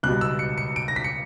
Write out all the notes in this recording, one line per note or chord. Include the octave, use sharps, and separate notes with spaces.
C#2 B2 G3 F#6
E6
C#7
C#7
D7
A#6
B6
C#7